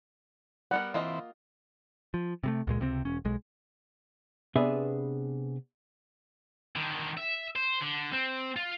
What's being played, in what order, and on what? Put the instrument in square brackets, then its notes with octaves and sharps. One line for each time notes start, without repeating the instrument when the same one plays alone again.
[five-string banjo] G3 B3 A#4 [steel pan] F#5
[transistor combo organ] E3 C4 [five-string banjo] A#3 F4 D#5
[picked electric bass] F3
C3 G3 A3
C#2 A#2 G#3
C#2 C3 D#3 C4
E1 C#4
B1 G#3
[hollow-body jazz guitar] C3 B3 D4 G#4 B4 E5
[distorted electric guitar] D3 D#3
E5
C5
D3
C4
F4